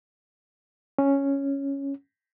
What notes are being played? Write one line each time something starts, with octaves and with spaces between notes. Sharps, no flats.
C#4